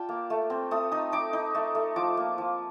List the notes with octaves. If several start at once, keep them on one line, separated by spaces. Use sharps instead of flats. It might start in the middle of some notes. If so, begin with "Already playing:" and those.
Already playing: F4 D5 G5 A5
A#3
A3
C4
A3 D#6
D#4 D#6
D#4 D6
D#4
A3
A3
F3 D6
A#3
F3